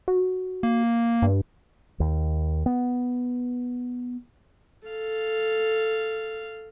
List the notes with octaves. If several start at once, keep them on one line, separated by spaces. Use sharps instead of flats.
F#4
A#3
G2
D#2
B3
A4 F5